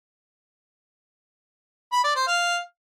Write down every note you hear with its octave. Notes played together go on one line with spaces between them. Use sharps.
B5
D5
C5
F5